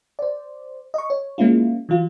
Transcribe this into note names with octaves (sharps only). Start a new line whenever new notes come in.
C5 D5
D#5 C#6
C#5
G#3 A#3 C#4 E4 F4
E3 F#3 F4